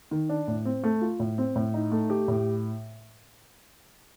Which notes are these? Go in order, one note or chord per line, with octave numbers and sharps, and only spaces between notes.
D#3
D4
A2
C4
A3
F4
A2
C4
A2
D#4
A3
G4
A2